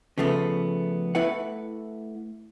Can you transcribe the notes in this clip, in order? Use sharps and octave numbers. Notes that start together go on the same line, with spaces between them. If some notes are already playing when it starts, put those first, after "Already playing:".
C#3 F3 A3 B3
A3 E4 B4 F#5